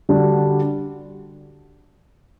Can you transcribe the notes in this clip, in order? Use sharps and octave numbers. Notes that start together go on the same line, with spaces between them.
D3 G3 D4 F#4